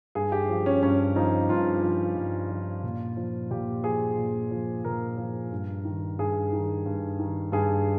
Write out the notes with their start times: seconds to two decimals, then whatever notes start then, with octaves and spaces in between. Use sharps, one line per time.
0.15 G2 G#4
0.32 G4
0.49 F3
0.66 C#4
0.83 G2 C#4
1.16 F3 D#4
1.49 G2 F4
1.83 F3
2.16 G2
2.50 F3
2.83 A#2
3.17 F3
3.50 A#2 G4
3.84 F3 G#4
4.17 A#2
4.51 F3
4.84 A#2 A#4
5.18 F3
5.52 G2
5.85 D#3
6.19 G2 G#4
6.53 D#3
6.86 G2
7.19 D#3
7.52 G2 G#4